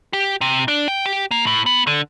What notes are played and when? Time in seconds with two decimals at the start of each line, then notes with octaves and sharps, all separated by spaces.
0.13 G4
0.41 C3
0.68 D4
0.88 G5
1.06 G4
1.31 A#3
1.47 A2
1.66 B3
1.87 D3